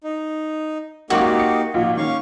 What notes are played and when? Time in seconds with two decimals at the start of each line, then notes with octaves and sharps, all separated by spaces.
0.04 D#4
1.10 G#1 F#2 A#3 D#4 F#4 G4 D6
1.36 D#6 C#7
1.74 D#2 A#2 F3 D#4
1.97 D#3 A#3 C#4 F5 C#6